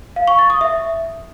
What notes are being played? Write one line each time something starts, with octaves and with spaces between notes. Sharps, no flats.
F5
C#6
A6
D#6
E5